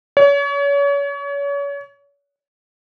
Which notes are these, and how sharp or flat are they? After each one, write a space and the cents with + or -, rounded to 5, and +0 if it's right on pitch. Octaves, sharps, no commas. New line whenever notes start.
C#5 +35